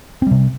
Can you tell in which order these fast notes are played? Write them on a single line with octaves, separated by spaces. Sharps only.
C4 G3 C3